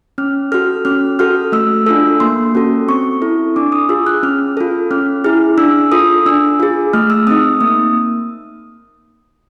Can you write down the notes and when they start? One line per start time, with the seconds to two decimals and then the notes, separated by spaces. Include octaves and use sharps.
0.18 C#4 F6
0.52 F#4 A4 F6
0.85 C#4 F6
1.19 F#4 A4 F6
1.52 A3 E6
1.86 D4 F4 A4 E6
2.20 A#3 C6
2.55 C#4 F#4 A4
2.88 C4 C#6
3.22 E4 A4
3.56 D4 D6
3.72 D#6
3.89 F4 G#4 E6
4.07 F#6
4.23 C#4 F6
4.57 F4 A4
4.91 C#4 F6
5.24 E4 G#4 F6
5.58 D4 E6
5.91 F4 A4 D#6
6.26 D4 E6
6.60 F4 G#4
6.93 A3 F6
7.10 E6
7.27 C4 D#4 D#6
7.61 A#3 D#6